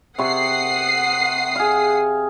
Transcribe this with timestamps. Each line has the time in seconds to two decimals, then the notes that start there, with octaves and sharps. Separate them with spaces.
0.18 C3 F#5 C#6 D#6 C7
1.56 G#4 F5